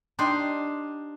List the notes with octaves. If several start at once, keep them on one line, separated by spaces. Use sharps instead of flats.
D4 D#4 G4 C5